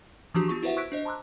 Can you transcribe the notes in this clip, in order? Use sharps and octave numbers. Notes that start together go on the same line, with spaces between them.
E3 F3 D4 F#4 G4
B3 F4 G4 C#6
E4 F#4 B4 C5 E5 F#5
C#6 E6 F#6 G#6 B6 D7
D4 C5 D#5
A5 A#5 C6 D6 E6 F#6